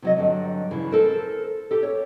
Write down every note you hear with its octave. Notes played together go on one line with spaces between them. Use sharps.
C3 F#3 D#5
G2 D3 F#3
G2 C#3 E3
A4 A#4 C5
G4 A4
C#5